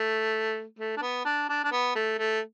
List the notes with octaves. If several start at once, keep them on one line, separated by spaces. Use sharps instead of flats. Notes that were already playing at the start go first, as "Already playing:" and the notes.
Already playing: A3
A3
D4
B3
D4
D4
D4
B3
A3
A3